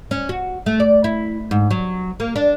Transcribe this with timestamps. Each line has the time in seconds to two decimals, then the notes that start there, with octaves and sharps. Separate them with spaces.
0.11 C#4
0.29 F#4
0.66 A3
0.80 D5
1.04 E4
1.51 G#2
1.71 F#3
2.20 A#3
2.36 D4